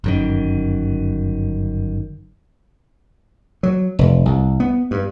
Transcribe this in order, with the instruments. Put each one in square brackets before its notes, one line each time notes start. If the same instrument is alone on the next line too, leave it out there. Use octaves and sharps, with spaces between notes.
[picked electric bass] G1 F#2 D#3
[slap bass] F#3
F1
C2
B3
G2